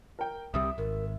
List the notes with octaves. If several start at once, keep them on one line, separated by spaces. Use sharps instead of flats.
A#4 G5
C2 C3 G3 E5 D#6
G#1 A#4